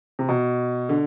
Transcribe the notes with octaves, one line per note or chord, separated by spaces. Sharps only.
C3
B2
D3